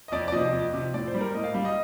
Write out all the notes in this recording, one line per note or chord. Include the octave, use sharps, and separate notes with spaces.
D#5
F2 D5
D5
C3 F3 D#5
F2
C3 F3
A2 D5
C5
G3
A#4
A2 D#5
F5
G3 F5
D#5